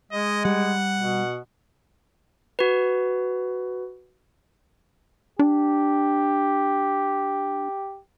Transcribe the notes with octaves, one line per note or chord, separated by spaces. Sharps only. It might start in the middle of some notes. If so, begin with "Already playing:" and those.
G#3 D#5
G3 F#5
B2
F#4 B4
D4 G4